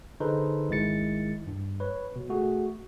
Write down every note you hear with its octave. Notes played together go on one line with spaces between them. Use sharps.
D3 D#4 G#4 A4 B4 C5
G#1 D#3 G#3 E4 A6 C#7
G2
B4 C#5
B2
A3 F#4 G#4